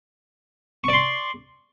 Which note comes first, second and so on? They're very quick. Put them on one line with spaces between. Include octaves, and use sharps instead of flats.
C#6 D5 C6